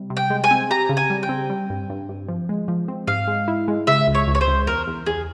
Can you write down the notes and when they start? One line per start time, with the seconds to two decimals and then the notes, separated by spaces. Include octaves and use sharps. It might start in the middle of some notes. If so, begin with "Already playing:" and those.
Already playing: C3 G3
0.10 C3
0.17 G5
0.30 G#3
0.44 G#5
0.51 C4
0.70 G4 A#5
0.89 C#3
0.97 G#5
1.10 G3
1.23 G5
1.29 C4
1.50 G3
1.70 G2
1.90 G2
2.09 G2
2.28 F3
2.49 G#3
2.68 F3
2.88 C4
3.08 G#2 F5
3.28 G#3
3.48 E4
3.68 G#3
3.87 C#3 E5
4.07 C#2
4.14 C#5
4.28 C#2
4.35 C#5
4.41 C5
4.48 C#2
4.67 E2 A#4
4.87 E2
5.06 E2 G#4